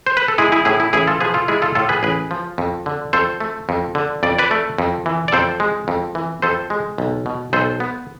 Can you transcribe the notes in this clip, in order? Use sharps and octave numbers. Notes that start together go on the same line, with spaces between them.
C5
B4
A4
G#3 E4 G#4
E4 G#4
A2 E4 G#4
E4
A1 E4 G#4
F4 A4
F3 G#4 B4
F4 A4
G#3 E4 G#4
F4 A4
A2 F4 A4
G#4 B4
A1 G#4 B4
F3
F2
D3
F2 A4 C5
A3
F2
D3
F2 D5
B4 D5
A3
F2
E3
D5
F2 A4 C5
G#3
F2
E3
F2 A4 C5
G#3
B1
B2
B1 A4 C5
B3